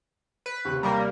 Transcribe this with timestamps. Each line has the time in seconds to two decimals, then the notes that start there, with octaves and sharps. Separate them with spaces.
0.46 B4
0.65 D#2 C3
0.83 G3 A#3 A#4